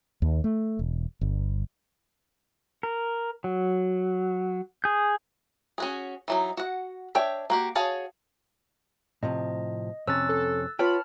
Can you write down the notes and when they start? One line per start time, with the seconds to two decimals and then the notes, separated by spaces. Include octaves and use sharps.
0.22 D#2
0.44 A3
0.79 E1
1.21 G1
2.83 A#4
3.44 F#3
4.84 G#4 G6
5.78 C#4 F#4 G#4
6.28 E3 F#3 D#4
6.57 F#4 F#5
7.15 D4 C#5 E5 G5
7.50 A#3 F#4 G4
7.75 F#4 G#4 C#5 F5 A5
9.23 A2 C3 F3 D#5
10.07 F2 C3 C#4 E6 F#6 A6
10.29 A4
10.79 F4 B4 C#5 G5 A5 B5 F6